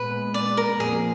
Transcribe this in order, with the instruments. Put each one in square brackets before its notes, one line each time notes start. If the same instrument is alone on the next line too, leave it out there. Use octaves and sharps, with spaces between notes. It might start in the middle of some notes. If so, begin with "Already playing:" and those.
Already playing: [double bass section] A#2 G#3 B3 [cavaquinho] B4
[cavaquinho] D5
A#4
[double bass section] F2 F3 A#3 [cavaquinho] G#4